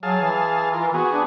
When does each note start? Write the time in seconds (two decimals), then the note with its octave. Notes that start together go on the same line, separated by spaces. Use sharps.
0.03 F#3 G#4 F5 A5
0.21 E3
0.73 F4 A#4
0.94 B3 F#4 G#4
1.13 D4